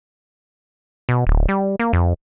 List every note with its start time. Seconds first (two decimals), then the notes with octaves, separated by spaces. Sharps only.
1.09 B2
1.27 D1
1.49 G3
1.80 A#3
1.93 F2